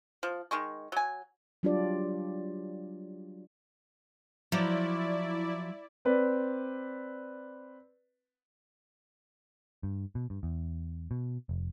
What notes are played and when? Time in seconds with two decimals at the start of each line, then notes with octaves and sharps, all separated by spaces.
0.23 F3
0.51 D#3 G#3 C#6
0.92 F#3 G#5
1.63 F#3 G3 D4 F4 G4 D5
4.52 F3 F#3 E4 D5
6.05 C4 B4 D5
9.83 G2
10.15 B2
10.30 G2
10.43 E2
11.11 B2
11.49 F1